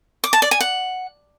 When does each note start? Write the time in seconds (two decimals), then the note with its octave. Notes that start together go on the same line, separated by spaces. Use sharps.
0.24 D6
0.33 A5
0.42 D5
0.51 G#5
0.60 F#5